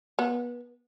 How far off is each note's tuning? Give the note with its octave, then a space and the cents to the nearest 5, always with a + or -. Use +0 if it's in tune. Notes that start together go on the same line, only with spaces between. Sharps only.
B3 -30